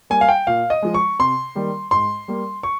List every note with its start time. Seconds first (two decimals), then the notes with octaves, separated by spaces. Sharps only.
0.10 G3 A#3 G#5
0.21 F5
0.29 G5
0.47 A#2 F5
0.70 D#5
0.82 F3 G#3
0.94 C#6
1.19 C3 C6
1.55 D#3 G3 A#3
1.91 G#2 C6
2.28 G3 A#3
2.63 C#6